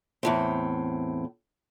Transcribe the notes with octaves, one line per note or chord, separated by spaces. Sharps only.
E2 A2 C4